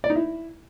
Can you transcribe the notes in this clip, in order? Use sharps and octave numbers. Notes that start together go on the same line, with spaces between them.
D5
D#4
E4